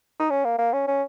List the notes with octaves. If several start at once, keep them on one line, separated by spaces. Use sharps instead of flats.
D#4
C#4
A#3
A#3
C#4
C#4